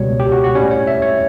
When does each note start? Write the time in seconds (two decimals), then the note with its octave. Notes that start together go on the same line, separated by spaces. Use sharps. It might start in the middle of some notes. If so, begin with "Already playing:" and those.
Already playing: C#2 B2 G3 C#5
0.20 G4
0.32 F#4
0.44 F#4
0.55 A2 G3 C#4 C#5
0.71 C#5
0.87 E5
1.02 C#5